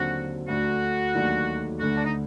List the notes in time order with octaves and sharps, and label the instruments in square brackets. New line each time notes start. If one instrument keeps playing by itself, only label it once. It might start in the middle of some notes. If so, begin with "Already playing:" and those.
Already playing: [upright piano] D#2 D3 F#3 C4 [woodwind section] F#4
[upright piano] D2 D3 A3 D4 [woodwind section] F#4
[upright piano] D#2 D#3 F#3 A3 D4
[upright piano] D2 D3 A3 [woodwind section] F#4
[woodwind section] D4
D#4